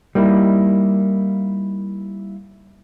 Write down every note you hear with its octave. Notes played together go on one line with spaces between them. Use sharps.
G3 A#3 D#4 E4